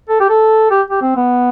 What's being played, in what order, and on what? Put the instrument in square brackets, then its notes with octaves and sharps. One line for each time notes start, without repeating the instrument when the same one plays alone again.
[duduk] A4
G4
A4
G4
G4
C4
B3